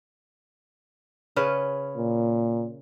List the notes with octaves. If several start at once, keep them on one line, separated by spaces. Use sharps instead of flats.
C#3 C#4 B4
A#2